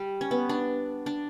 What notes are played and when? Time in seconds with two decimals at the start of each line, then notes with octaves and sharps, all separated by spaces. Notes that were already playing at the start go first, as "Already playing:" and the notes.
Already playing: G3
0.21 C#4
0.31 B3
0.49 D4
1.06 D4